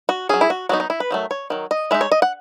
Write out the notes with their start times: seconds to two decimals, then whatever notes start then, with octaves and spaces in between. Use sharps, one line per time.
0.09 F#4
0.29 F#3 C#4 G#4
0.41 E4
0.50 F#4
0.69 F#3 B3 D#4 F#4
0.80 D#4
0.90 E4
1.00 B4
1.11 D#3 F#3 A3
1.31 C#5
1.50 D#3 F#3
1.71 D#5
1.91 G#3 D#4 E5
2.01 C#5
2.12 D#5
2.22 F#5